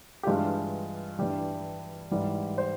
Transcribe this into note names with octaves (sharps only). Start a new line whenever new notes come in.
G4
G2 E3 G#3 F4
G2 E3 G3 G4
G#2 E3 G3
C5